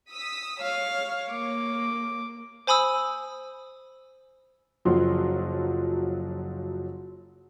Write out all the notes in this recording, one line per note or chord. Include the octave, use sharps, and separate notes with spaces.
D#6 E6 B6
C#5 F5
A#3 D6
C5 G#5 B5 D#6 E6
F#1 F3 F#3 C6